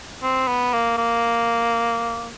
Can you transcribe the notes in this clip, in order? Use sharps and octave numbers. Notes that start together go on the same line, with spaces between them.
C4
B3
A#3
A#3